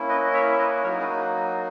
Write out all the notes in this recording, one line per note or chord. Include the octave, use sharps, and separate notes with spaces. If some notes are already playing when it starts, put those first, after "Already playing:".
Already playing: A#3 C#4 E4
B4 D#5
D#5
C#5 E5
B4 D#5
F#3 A#3 D#4 F#4 A#4 C#5
G#4 B4